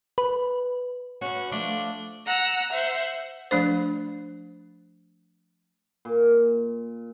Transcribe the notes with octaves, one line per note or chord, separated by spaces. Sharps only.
B4
C#4 F#4 B4
F3 A3 D4
F#5 A#5 E6
C5 E5 F#5
F3 A3 D4 C5
A#2